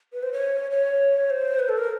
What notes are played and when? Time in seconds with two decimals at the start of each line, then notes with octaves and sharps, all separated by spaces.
0.13 B4
0.23 C5
0.33 C#5
0.71 C#5
1.30 C5
1.59 B4
1.69 A4
1.78 A#4